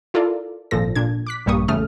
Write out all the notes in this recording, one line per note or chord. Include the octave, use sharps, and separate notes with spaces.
E4 F4 A4 A#4 D5
G#1 A#2 F3 A4 A#6
A#2 D4 G#6
D6 F#6 B6
A#1 G2 G3 A#3 C#6 D#6
A1 E2 C#3 A3 D#6 F6